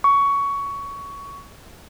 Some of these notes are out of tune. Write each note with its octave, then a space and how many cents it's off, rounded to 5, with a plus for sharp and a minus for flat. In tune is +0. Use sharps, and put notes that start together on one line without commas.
C#6 +15